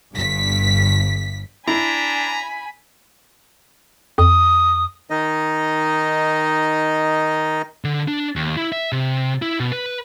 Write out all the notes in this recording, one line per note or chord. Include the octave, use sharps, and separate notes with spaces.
G1 G2 B6
D4 E4 G#5 A#5 B5
F2 D#6
D#3 D#4 D#5
D3
D4
D#2
E4
E5
C3
E4
B2
B4